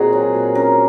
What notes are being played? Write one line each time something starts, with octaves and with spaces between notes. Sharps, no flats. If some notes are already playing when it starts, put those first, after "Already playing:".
Already playing: A#2 D#3 C4 F#4 G#4 A#4
F#3
A#2
C#4 A#4